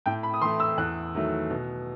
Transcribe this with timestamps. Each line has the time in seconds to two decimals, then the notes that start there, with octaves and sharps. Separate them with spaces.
0.06 A2 G5
0.23 B5
0.34 D#6
0.41 E3 C6
0.45 A3
0.60 E6
0.78 E2 F#6
1.14 D#3 F#3 A3
1.50 B2